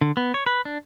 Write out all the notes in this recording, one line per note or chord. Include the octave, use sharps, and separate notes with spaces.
D3
B3
C#5
B4
D4